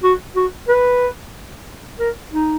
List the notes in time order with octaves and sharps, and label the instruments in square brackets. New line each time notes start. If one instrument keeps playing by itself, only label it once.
[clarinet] F#4
F#4
B4
A#4
D#4